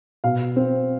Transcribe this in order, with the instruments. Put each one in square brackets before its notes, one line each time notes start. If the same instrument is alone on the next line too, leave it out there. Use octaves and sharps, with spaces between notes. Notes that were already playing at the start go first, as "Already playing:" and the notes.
[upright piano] B2 F5
C4